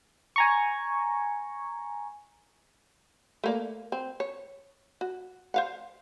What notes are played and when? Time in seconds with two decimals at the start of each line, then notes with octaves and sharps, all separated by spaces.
0.36 G#5 A#5 C#6
3.44 A3 A#3 D5
3.92 C4
4.20 C#5
5.01 F#4
5.54 C5 F5 F#5